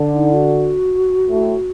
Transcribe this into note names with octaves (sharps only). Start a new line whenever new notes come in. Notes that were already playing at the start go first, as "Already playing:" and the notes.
Already playing: D3
D#4
F#4
A2